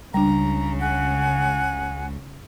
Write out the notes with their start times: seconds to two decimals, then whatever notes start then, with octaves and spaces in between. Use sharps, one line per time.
0.14 C#2 C#3 G3 D4 A#5
0.80 F#5 G#5